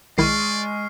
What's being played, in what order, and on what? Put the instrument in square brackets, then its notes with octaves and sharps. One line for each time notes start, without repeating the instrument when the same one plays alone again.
[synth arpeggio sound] B1 D#3 E4 [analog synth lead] G#3 [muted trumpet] D5 [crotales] C#6 F6 C7